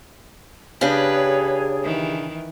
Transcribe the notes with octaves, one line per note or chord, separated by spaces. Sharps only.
C#3 D4 G4 G#4 B4 C#5 G#5
D#3 E3